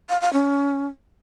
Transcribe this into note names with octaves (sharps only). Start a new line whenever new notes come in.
F5
F5
C#4